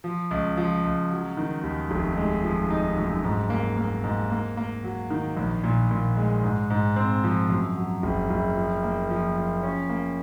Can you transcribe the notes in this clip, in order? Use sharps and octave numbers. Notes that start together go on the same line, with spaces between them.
F3
C#2
F3
C#2
F#3
D#3
D#2
F1
G#3
F3
D#4
F#2
G#2
A#3
A#3
G#2
A#3
A#3
F#3
D#3
A#1
A#2
A#2
G#3
G#2
G#2
C4
F3
F#2
F#3
F#1
F#1
F3
A#3
F3
F3
C#4
A#3